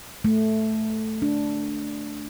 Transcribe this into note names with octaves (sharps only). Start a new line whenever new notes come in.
A3
D4